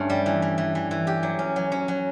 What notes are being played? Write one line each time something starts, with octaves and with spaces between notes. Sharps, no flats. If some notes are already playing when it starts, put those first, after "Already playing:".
Already playing: G2 A3 C#4
G3
E3
E3
E3
E3
E3
G4
F#3
C#4
F#3
C#4
F#3